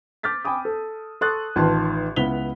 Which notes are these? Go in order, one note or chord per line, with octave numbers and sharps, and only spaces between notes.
D6 F6 G6 A6 B6
G5 G#5 B5 D6 D#6
A4
A4 C6 C#6 D#6 F#6 A6
A1 D#3 F4 B4 A5 C6
C#2 B3 E4 B6 F7 G7